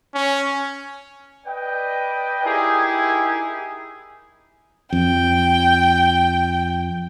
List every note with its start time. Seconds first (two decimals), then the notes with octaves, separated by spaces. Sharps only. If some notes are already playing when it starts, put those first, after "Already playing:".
0.14 C#4
1.46 B4 D5 D#5 G5
2.43 D#4 E4 G4 G#4 A#4 G#5
4.92 F2 G5